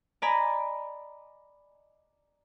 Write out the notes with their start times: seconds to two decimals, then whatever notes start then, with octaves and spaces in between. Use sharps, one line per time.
0.22 D5 D#5 G#5 A#5 B5